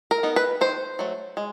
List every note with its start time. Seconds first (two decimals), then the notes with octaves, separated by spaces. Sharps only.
0.11 A#4
0.23 B3 D#4
0.36 B4
0.61 D#3 C5
0.99 F#3 A3
1.37 G#3